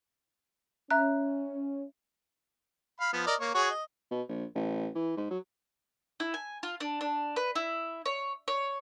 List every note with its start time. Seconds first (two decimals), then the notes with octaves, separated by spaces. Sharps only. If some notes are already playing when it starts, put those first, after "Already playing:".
0.91 C#4 E5 A#5 F#6
3.00 F5 B5
3.13 F3 B3
3.27 A#4 D5 D#5
3.40 A#3 C#5
3.54 F#4 G#4 C#5
3.70 D#5
4.11 B2
4.28 A#1
4.55 A1
4.95 E3
5.17 G#2
5.30 F#3
6.20 E4
6.34 G#5
6.63 F4
6.80 D4
7.01 D4
7.36 B4
7.55 E4
8.06 C#5
8.48 C#5